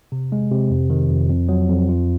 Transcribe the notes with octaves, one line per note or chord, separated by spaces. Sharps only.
C3
G#3
C3
F2
D#3
F2
F2
F#3
F2
F4